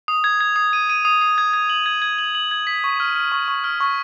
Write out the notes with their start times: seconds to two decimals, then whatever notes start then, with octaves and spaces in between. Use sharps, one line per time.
0.08 D#6
0.24 G#6
0.41 G#6
0.56 D#6
0.73 D#7
0.90 D#7
1.05 D#6
1.21 D#6
1.38 G#6
1.53 G#6
1.70 F#7
1.86 G#6
2.02 G#6
2.18 F#7
2.35 F#7
2.51 G#6
2.67 B6
2.84 C#6
3.00 F6
3.16 F6
3.32 C#6
3.48 C#6
3.64 F6
3.80 C#6